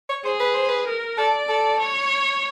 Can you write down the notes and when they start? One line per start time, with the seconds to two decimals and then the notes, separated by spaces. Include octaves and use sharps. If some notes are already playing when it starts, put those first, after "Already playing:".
0.09 C#5
0.25 G#4 C5
0.40 B4
0.54 C5
0.69 B4
0.87 A#4
1.18 A4 D5
1.49 A4
1.80 C#5